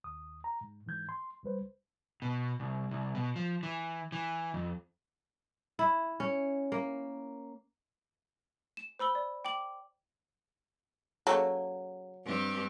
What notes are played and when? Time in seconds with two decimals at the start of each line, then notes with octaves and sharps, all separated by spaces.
0.04 D#2 D#6
0.44 A#5
0.61 G#2
0.86 G#2 E3 G6 G#6
1.09 C6
1.43 C#2 G3 B4 C5
2.22 B2
2.60 C2
2.91 C2
3.15 B2
3.36 F3
3.63 E3
4.12 E3
4.54 F2
5.79 E4
6.20 C#4
6.72 A#3
8.77 E7
8.99 C5 B5 E6 G7
9.15 D5
9.45 G5 D6 F#7
11.27 C#3 F#3 A#3 A4
12.25 G2 C4 G4